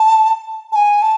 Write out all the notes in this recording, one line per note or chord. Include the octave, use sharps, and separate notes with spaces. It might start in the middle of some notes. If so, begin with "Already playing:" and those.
Already playing: A5
A5
G#5
A5